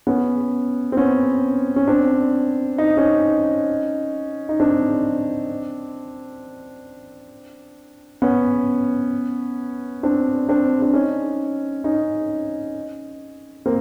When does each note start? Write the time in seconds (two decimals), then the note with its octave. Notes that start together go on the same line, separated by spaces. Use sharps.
0.07 B3 C#4
0.92 C4
0.97 B3 C#4
1.76 C#4
1.88 C4 D4
2.78 D#4
2.97 C#4 D#4
4.49 D#4
4.60 C4 D4
8.22 B3 C#4
10.03 C4 D4
10.49 C4 D4
10.82 D4
10.93 C#4 D#4
11.84 C#4 D#4
13.66 A#3 C4